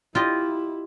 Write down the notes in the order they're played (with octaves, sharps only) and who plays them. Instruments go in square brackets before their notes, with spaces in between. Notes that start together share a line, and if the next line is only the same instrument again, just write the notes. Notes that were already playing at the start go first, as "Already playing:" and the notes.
[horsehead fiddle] E4 [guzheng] F4 G4 D#5